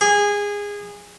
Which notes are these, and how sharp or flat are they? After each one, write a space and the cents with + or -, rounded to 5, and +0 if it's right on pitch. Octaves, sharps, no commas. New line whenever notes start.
G#4 -20